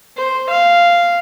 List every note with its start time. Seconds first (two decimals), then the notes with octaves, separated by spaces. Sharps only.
0.17 C5
0.49 F5